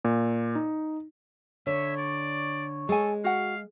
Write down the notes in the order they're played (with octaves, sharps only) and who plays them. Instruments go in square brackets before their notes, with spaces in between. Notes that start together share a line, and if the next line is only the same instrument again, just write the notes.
[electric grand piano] A#2
D#4
[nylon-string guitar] D3 [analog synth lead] C#5 [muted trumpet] E5
[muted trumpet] D5
[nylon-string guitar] G#3 [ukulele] G#4 G#5 [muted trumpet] A4
[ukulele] F#4 F#5 [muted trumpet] F5